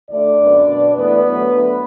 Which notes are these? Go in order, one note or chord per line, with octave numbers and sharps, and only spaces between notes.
D2 D3 A3 D4 D5
F#2 D3 B3
B2 B3
E2 E3 A3 B3 B4
D2 D3 F#3 A3
D2 D3 A3